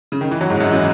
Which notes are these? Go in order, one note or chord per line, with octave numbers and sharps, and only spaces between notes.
C#3
D#3
E3
F#3
G#2 G#3
F#2 F#3
E3